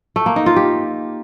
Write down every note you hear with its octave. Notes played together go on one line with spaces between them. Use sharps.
A3
A#3
D#4
F4
G4